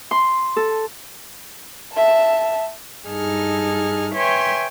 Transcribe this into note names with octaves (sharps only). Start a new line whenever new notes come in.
C6
A4
E5 A5
G2 D#4 G#4 A4 F6
B4 C#5 E5 G5 G#5 C6